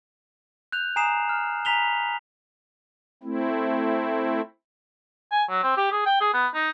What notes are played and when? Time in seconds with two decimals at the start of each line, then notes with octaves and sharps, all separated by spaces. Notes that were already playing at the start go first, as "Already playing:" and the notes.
0.72 F#6 G6 F7
0.96 G#5 A#5 D#6 C7 E7
1.29 F6
1.65 G#5 A#5 B5 B6 F7 G7
3.23 A3 C4 E4
5.32 G#5
5.49 F#3
5.63 C4
5.77 G4
5.92 G#4
6.06 G5
6.21 G#4
6.34 B3
6.55 D#4